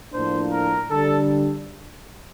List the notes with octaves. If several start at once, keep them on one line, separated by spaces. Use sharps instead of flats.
A2 F3 A#3 D4 C5
A#4
D3 G3 D4 A4